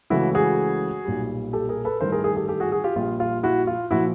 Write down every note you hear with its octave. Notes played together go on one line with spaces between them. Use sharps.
C#2 C#3 E3 A3 E4 F#4
F#4 G#4
B1 A#2 G3
G4 A4
G#4 A#4
A4 B4
A1 G2 D#3 A#4 C5
G#4 A#4
G#4 A#4
G4 A4
G4 A4
F#4 G#4
F#4 G#4
F4 G4
A#1 A#2 G3 F4
F4
E4 F#4
F4
A#2 F3 E4 F#4